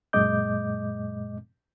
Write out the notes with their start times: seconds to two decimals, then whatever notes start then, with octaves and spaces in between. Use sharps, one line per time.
0.13 F#2 A#2 G#3 D#5 D6 G6